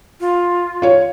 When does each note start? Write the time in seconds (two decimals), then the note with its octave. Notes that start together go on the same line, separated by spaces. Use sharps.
0.20 F4
0.82 F4 C#5